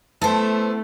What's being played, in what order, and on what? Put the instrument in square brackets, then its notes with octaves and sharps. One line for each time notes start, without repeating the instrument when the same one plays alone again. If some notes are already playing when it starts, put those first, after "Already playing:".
[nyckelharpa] A3 [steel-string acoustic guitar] B3 C5 [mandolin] E4 A4 A5